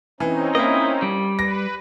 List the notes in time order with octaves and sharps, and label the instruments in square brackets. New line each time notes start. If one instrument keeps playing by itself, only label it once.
[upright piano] E3 [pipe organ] C4 C#4 D#4
[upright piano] A#3 [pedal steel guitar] E4 D#5
[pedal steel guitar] G3
[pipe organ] B4 [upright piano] A#6